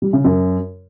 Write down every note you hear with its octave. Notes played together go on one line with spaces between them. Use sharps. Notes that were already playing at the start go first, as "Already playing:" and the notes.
G3
C#3
F#2